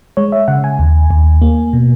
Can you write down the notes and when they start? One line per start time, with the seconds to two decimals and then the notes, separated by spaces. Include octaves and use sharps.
0.17 G#3 C#5
0.32 E5
0.48 C#3 F#5
0.64 G#5
0.79 D#2
1.10 D#2
1.42 A#3
1.73 B2